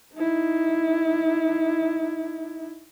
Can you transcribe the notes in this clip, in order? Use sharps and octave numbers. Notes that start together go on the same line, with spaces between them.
D#4 E4